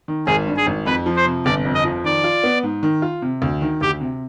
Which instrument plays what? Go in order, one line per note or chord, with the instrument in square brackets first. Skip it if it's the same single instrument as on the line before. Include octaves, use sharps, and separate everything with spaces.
[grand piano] D#3
[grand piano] G#1 [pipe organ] G#4
[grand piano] G2
[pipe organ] G#4
[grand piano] G#1
[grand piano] F2 [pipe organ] B4
[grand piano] F3
[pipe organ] C5
[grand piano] C3
[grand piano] G1 [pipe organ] D5
[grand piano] F2
[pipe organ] D#5
[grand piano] F3
[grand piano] D#3 [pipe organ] D5
[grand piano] F4
B3
G#2
D#3
F4
C3
D2
D#3
[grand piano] D2 [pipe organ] G4
[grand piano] C3